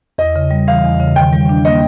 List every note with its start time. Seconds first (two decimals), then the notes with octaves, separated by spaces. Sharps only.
0.18 E2 D#5
0.36 C#3
0.51 G3
0.68 E3 F5
0.84 E2
1.00 C#3
1.16 D#3 G5
1.33 G3
1.49 D4
1.65 A#3 D#5